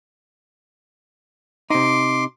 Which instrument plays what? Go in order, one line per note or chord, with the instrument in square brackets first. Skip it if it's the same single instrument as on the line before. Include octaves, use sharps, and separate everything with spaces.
[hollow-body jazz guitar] C3 D#4 [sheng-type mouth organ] C6 D6